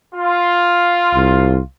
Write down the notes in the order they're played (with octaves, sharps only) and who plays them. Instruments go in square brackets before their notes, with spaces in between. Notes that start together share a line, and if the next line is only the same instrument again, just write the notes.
[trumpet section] F4
[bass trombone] C2